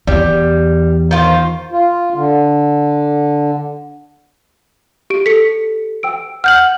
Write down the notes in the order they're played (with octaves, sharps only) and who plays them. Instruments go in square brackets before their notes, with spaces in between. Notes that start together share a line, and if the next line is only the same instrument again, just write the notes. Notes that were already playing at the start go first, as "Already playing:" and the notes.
[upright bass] E2 [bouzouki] G3
[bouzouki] D#3 F4 C5
[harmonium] F4
D3
[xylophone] G4 D7
[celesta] G4 A4 [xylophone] B6 C#7
[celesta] G5 E6 D7
[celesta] F#5 [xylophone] F6 G6 F#7